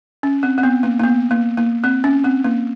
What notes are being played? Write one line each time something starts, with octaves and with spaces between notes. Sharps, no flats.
C#4
C4
C4
B3
A#3
A#3
B3
A#3
A#3
C4
C#4
C4
A#3